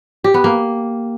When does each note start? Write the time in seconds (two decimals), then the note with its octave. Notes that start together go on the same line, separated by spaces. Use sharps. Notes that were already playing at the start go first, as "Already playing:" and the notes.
0.24 G4
0.34 B3
0.44 A#3